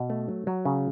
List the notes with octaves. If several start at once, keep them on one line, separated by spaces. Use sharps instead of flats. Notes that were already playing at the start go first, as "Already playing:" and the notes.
Already playing: B2
A3
F#3
F#3
C#3